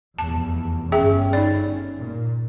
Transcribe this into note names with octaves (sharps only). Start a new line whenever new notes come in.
F1 E2 A5
G1 C#4 G#4 E5 G5
D#4 D5
A#2